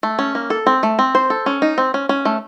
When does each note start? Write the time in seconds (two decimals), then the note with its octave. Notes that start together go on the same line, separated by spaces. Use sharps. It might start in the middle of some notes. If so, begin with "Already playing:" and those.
0.03 A3
0.19 C#4
0.35 A#3
0.50 A4
0.67 C4
0.83 A3
0.99 C4
1.15 C5
1.30 A4
1.46 C#4
1.62 D#4
1.78 C4
1.94 C#4
2.09 C#4
2.25 A3